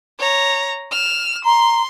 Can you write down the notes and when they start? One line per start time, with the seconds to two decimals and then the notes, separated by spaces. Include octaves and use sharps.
0.19 C#5 A#5
0.91 F6 E7
1.45 A#5 C6